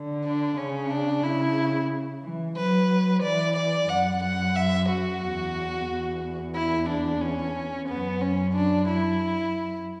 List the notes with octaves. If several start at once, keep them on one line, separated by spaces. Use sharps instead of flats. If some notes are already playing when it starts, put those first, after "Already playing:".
Already playing: D3
D4
C#3 C#4
D4
C#3 E4
E3
F#3 B4
E3 D5
D5
F#2 F#5
F#5
E5
F#4
E2
E2
E4
D4
C#4
F#2 B3
C#4
D4
E4